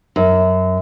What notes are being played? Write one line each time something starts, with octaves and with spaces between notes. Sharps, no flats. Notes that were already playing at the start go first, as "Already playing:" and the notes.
F#2